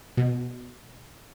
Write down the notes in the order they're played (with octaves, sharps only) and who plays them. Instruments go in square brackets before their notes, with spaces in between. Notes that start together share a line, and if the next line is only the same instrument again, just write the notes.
[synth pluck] B2